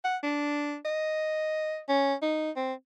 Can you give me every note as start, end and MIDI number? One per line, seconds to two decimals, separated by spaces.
0.05 0.17 78
0.23 0.76 62
0.85 1.80 75
1.89 2.14 61
2.22 2.51 63
2.56 2.73 60